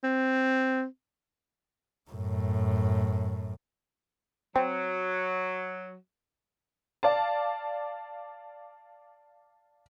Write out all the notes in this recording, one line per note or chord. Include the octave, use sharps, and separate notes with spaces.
C4
F#2 A2
F#3 C4
D5 F5 A5